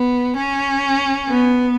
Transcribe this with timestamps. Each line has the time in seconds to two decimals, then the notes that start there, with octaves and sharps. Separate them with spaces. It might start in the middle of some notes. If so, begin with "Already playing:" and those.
Already playing: B3
0.37 C#4
1.30 B3